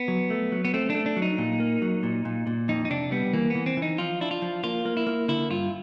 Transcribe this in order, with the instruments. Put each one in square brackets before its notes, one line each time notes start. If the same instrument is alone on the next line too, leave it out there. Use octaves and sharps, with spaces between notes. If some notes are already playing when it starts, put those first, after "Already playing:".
Already playing: [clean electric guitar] B3
[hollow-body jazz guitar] F#3
A3
F#3
[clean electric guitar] B3
[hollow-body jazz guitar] A3 [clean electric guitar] C4
[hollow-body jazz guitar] A3 [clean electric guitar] D4
[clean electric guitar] D4
[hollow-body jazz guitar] F#3
[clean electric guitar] D#4
[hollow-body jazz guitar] A#2
A#3
F#3
A#2
A#2
A#2
[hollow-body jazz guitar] F2 [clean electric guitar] D#4
[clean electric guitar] D#4
[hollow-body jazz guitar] C3 [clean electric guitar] D4
[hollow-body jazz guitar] G3 [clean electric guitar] B3
[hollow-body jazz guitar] E3 [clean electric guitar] A#3
[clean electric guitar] B3
[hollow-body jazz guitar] E3
[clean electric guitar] C4
[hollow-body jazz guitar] E3
[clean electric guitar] D#4
[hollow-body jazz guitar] F3 [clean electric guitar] F4
[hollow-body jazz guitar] D4 [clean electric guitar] E4
[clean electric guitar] F4
[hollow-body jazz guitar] F3
[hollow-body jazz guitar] A#3 [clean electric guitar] F4
[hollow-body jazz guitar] A#3
[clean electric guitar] E4
[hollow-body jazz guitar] A#3
[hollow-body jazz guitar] D3 [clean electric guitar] E4
[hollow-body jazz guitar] G2 [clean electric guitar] F4